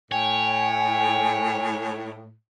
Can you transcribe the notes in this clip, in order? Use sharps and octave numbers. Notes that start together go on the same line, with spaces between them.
A2 C#5 G5 G#5